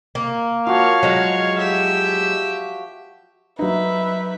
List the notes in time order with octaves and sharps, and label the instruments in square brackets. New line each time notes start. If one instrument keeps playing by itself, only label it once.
[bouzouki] A#3
[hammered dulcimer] F3 F#4 [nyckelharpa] C#5 F5
[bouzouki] F#3 G#3
[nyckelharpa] G4 E5
[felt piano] F#3 D#4 [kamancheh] B4 E5